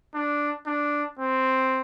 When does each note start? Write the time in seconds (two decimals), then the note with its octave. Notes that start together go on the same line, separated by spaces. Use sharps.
0.14 D4
0.67 D4
1.19 C4